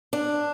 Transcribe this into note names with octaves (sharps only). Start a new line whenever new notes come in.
D4